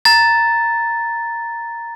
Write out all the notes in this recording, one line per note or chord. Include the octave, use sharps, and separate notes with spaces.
A#5 A6